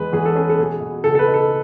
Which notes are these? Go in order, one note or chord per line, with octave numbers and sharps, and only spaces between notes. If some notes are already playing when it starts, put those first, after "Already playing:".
Already playing: E2 G#3 B4
E2 G#4
A4
C#4 G#4
A4
B2 G#4
B2
C#2 A4
A4
B4
D#4
A4